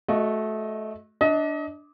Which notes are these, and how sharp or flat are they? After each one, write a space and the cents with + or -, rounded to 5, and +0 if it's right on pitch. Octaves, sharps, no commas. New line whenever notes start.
A3 -20 F#4 -5 D#5 +0
D4 +0 D#5 +30